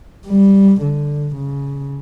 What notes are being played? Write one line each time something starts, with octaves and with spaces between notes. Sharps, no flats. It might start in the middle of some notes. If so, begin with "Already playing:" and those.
G3
D3
C#3